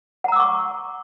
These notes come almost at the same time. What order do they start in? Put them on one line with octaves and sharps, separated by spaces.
F#5 A#5 E6 D6 C#6